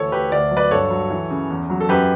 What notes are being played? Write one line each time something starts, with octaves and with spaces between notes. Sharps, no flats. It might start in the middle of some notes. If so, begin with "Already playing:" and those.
Already playing: D2 E3 A4 C#5
D2 G4 B4
D2 D5
F#3
B4 D5
G2 A4 C#5
F#3
E3
C#3
E2
F#3
A4
F#2 G4 B4